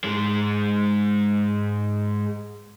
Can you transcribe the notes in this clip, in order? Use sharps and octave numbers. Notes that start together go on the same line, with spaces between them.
G#2 G#3